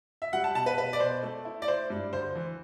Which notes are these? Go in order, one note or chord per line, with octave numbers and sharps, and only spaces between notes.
E5
G3 F#5
A5
B2 A5
B4
B2 B4
D5
B2 C5
A3
E4
D5
E4 C5
G2
D2 C5
E3